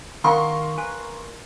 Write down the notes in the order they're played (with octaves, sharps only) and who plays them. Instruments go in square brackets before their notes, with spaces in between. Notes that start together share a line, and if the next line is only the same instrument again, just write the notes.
[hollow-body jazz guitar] D#3 F#5 [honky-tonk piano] A#4 C6 C#6 [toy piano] F5
[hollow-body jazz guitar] B4 [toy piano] G#5